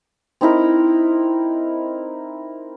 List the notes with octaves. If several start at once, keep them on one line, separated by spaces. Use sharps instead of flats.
C4 D#4 E4 A#4